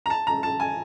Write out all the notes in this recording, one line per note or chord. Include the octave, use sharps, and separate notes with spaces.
A#5
A5
A#5
A5
G#5